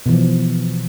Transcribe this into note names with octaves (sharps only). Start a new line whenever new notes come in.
B2 E3 F3